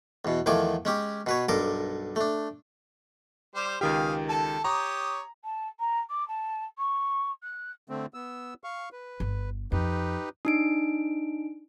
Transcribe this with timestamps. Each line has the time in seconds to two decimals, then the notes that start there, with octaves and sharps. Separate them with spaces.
0.25 E2 B2
0.46 E2 D#3 F3 A3 G#5 D6
0.85 G#3 C#4 G4
1.26 B2 B4 C#5
1.49 B1 G2 A4 A#4 D6
2.16 A3 D4
3.55 G3 G4 C5
3.81 C#2 D#3 G4 G#4 F5
4.28 A4 A5
4.64 G4 C#5 A#5 D#6
5.44 A5
5.80 A#5
6.10 D6
6.28 A5
6.78 C#6
7.43 F#6
7.89 D3 A3 C4
8.14 B3 E6
8.64 F5 C#6
8.92 B4
9.20 G1
9.72 F2 D#4 G4 B4
10.45 D4 D#4 D7